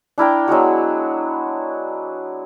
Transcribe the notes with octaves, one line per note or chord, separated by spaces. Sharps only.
D4 E4 A#4 G5
F#3 G#3 B3 F#4